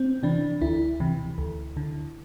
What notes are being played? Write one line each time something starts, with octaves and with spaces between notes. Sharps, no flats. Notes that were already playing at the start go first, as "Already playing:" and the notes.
Already playing: C4
C3 E3 D4
D2 E4
C3 E3
D2
D3